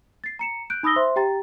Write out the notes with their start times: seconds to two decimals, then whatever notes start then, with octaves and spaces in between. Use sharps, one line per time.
0.24 A6 C7
0.39 A#5 C#7 E7
0.70 F#6 G6 D7
0.83 D#4 B5 D#6 E6 A#6 G7
0.96 C5 E5 C6
1.16 G4 G5 A#5 A6